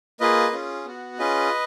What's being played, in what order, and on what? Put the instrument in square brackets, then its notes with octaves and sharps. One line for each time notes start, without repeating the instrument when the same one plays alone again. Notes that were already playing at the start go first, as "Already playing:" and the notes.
[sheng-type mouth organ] A#3 F4 G#4 B4 D#5
C#4 F4 G#4
B3 F#4
C#4 F4 G#4 B4 D#5